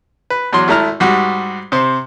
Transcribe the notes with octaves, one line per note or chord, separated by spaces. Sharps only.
B4
E2 F#3 C6
G#1 A3 E4 A#5 F6
G#2 G3 F#4
C3 C5